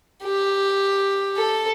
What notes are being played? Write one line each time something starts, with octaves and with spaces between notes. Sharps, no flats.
G4
A4